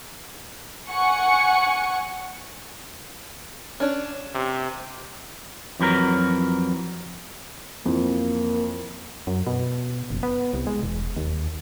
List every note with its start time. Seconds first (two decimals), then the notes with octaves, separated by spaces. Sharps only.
0.91 F#5 G#5 C#6 C#7
3.80 C#4 D4
4.35 C3
5.80 F2 E3 F#3 A#4
7.86 F2 E3 A#3
9.27 F#2
9.47 B2
10.10 F#1
10.23 B3
10.53 C2
10.67 G#3
10.83 E1
11.16 D#2